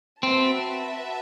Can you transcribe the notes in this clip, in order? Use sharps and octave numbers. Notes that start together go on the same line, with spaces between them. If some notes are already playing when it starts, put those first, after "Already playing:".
C4 F#4 B4 E5 A5